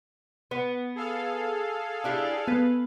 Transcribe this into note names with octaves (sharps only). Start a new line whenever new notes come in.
B3
G#4 A4 F5
D4 E4 G4
B3 B4